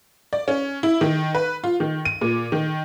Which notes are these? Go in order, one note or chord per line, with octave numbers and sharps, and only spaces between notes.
D5
C#4
E4
D#3
B4
F4
D#3
D#7
A#2
D#3